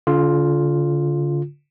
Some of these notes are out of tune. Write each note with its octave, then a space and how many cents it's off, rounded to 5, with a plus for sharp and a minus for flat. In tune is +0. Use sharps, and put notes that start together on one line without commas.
D3 -35 F4 +0